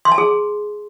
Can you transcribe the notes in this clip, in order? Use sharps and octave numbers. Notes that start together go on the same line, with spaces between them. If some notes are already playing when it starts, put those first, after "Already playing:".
C6
A5
G#4